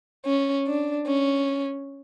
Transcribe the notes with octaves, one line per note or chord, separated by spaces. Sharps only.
C#4
D4
C#4